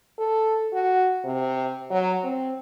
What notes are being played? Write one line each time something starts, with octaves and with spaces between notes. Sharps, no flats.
A4
F#4
C3
F#3
C4